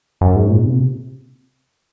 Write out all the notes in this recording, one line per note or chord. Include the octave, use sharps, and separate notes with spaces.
F#2
G#2
A#2
C3